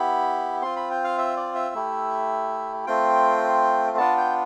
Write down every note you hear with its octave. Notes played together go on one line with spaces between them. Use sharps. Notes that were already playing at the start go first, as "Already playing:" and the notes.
Already playing: B3 E4 G4 B5
C4 F4 C6
B5
G5
F5
E5
D5
E5
A3 E4 G4
A3 C4 F4 G5
B3 D4 F4 A5
G5